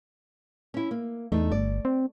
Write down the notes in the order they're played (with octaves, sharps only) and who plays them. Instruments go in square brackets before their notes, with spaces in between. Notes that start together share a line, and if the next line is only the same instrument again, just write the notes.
[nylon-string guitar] C#4 E4
A#3
[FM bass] E2 [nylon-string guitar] A3 D4 D#4
[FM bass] G1 [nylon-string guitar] D5
[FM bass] C4